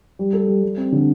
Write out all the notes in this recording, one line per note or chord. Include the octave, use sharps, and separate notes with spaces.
G3
A4
G3
G3
C4
D3